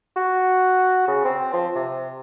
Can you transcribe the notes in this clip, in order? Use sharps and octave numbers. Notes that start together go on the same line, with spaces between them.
F#4
C#3
C4
F3
C3